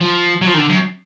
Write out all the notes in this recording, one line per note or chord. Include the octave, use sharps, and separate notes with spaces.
F3
F#3
F3
D#3
D3
F#2